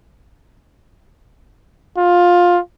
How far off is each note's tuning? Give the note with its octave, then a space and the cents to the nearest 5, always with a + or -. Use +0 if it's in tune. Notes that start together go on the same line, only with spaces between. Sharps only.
F4 +15